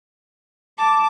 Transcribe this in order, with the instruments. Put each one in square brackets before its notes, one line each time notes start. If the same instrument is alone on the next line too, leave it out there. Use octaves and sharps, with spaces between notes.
[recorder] A5 [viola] D6